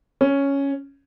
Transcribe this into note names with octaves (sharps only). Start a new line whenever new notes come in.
C#4